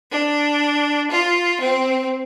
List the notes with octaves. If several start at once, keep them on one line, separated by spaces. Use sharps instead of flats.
D4
F4
C4